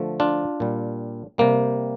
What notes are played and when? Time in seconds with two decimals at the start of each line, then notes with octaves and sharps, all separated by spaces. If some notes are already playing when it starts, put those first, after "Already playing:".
Already playing: D3 F3 A3
0.20 D4 F4
0.60 A#2 G3
1.38 C3 G3 A#3